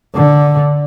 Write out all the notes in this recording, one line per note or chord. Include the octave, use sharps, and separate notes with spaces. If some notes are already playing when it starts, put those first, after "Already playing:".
D3